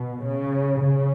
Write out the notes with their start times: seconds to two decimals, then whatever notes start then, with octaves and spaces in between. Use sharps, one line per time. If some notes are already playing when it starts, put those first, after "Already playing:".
Already playing: B2
0.24 C#3
0.81 C#3